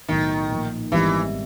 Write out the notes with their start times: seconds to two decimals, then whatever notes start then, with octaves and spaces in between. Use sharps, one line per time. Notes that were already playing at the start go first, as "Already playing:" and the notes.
0.08 B1 A2 D#3 F#3
0.51 A#2 F3 A#3
0.92 G#1 G#2 D#3 E3 G3 B3